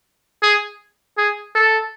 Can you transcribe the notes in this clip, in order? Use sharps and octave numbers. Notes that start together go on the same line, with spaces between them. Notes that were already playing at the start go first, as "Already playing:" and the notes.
G#4
G#4
A4